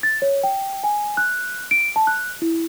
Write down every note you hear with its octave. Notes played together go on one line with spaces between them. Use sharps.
A6
C#5
G5
G#5
F#6
D7
A5
F#6
E4